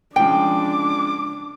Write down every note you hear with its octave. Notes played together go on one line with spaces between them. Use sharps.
C#3 F3 G#3 D4 G5 D6